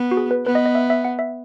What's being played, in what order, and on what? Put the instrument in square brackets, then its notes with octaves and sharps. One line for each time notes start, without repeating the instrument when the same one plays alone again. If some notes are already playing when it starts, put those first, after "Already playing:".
Already playing: [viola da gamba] B3
[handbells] F#4
G#4
B4
[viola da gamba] B3 [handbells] B4
[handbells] D#5
D#5
E5
E5
F#5
E5